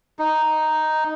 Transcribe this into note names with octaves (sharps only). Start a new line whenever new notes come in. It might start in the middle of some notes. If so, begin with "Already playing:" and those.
D#4